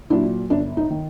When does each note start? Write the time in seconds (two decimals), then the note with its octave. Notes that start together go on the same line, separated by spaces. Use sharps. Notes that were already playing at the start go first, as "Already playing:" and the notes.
0.10 A#2 F#3 D4 E4
0.50 G1 D4
0.77 D#4
0.90 D#3